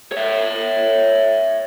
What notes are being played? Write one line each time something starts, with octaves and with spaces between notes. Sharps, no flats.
C#5 E5